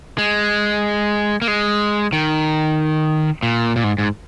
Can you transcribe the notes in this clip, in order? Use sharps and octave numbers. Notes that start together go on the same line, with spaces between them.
G#3
A#3
G#3
D#3
A#2
A#2
G#2
G#2